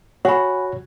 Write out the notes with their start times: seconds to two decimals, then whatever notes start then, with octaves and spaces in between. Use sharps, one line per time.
0.25 F#4 C#5 F#5 G#5 B5